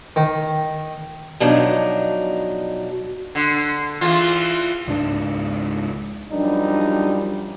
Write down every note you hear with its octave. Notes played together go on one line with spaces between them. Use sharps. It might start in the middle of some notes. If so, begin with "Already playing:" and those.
D#3
B2 F3 F#3 D4 D#4
D3
E2 E3 F4
C#2 G#2 D4
F#2 F3 G3 D4 D#4